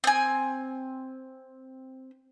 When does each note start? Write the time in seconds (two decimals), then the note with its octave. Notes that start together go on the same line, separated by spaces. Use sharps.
0.04 C4 G#5